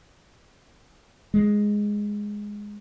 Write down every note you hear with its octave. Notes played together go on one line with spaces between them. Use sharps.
G#3